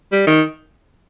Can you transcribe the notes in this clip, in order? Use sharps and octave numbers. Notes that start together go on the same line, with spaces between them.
G3
D#3